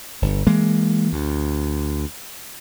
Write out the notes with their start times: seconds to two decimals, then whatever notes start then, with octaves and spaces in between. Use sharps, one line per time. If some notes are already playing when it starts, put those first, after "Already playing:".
0.22 G1
0.47 E3 G#3 A#3
1.13 D2